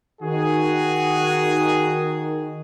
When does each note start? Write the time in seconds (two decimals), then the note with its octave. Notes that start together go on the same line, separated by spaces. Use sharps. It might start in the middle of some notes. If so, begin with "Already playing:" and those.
0.22 D#3 F#4 G#4